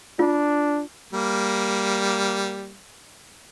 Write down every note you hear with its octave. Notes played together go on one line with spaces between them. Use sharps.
D4 F4
G3 A#3